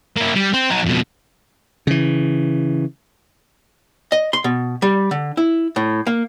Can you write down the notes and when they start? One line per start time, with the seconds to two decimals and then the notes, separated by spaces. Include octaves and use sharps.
0.17 A#3 E4
0.35 G3
0.54 C4 C5
0.70 F#3 D#4
0.86 F2 B2
1.87 C#3 E3
4.12 D#5
4.33 C6
4.44 B2
4.82 G3
5.11 D3
5.37 E4
5.76 A2
6.07 A#3